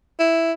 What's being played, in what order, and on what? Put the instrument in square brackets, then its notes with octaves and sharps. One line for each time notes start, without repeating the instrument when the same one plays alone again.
[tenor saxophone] E4